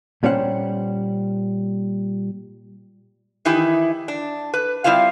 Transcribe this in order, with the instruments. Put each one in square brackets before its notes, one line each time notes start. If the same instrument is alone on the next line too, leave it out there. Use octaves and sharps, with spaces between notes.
[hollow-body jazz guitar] A#2 G3 C#4 C5 F#5
[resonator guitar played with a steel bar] D#3 E3 D#4 E4 G4
D4
B4
G3 C4 E4 F4 F5